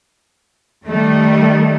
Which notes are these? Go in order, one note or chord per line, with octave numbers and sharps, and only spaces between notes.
D#3 G3 A3